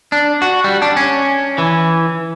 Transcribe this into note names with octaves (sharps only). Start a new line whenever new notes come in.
D4
F#4
G3
D4
C#4
E3